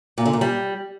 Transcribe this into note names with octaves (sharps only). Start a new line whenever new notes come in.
A#2
D3
A#2
G3